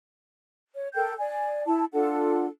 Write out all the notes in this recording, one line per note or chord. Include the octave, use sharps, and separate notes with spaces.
C#5
A4 A#4 G5 G6
D5 G#5
E4 A5
D4 F4 A4 F#5